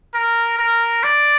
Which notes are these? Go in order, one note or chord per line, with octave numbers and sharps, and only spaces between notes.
A#4
A#4
D5